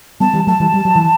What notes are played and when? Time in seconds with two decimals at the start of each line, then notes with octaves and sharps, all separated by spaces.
0.20 G3 B3 A5
0.33 E3 G3
0.47 F#3 A3 A5
0.60 E3 G3
0.74 G3
0.85 F#3
0.95 E3